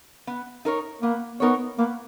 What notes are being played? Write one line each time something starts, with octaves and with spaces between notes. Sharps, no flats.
B3
D#4 A#4 C#5
A#3 B3
B3 D#4 A#4 C#5
A#3 B3